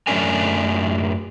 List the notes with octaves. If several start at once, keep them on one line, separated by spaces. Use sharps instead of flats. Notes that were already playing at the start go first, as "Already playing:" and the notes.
F#2 A3 C#4 D4 A#4 G#5